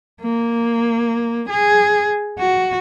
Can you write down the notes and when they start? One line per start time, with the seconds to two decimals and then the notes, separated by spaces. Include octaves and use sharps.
0.22 A#3
1.50 G#4
2.39 F#4